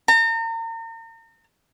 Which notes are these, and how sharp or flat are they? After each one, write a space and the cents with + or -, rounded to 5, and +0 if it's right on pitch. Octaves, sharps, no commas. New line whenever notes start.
A#5 -40